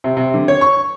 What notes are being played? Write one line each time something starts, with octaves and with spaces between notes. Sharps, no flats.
C3
C3
D3
C#5
C#6